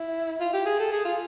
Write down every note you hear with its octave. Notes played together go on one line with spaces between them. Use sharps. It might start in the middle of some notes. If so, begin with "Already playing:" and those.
Already playing: E4
F4
G4
G#4
A4
G#4
F4